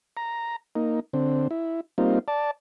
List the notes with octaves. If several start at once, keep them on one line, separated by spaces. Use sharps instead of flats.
A#5
A#3 D#4
D3 C4
E4
G3 A#3 C4 D#4 F4
D5 A5